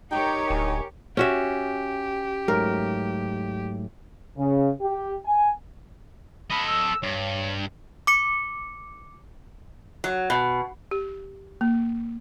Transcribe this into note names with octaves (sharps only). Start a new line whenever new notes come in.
D#4 G4 A#4 C#5 G5
D1 G#5
C#4 F#4 G4 E5
G#2 F#3 A3 A#4
C#3
G4
G#5
A4 D#5 B5
E6
G2 C#5
D6 C#7
F#3
B2
G4
A#3